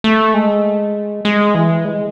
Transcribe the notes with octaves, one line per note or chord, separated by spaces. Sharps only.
A3
G#3
G#3
E3
G#3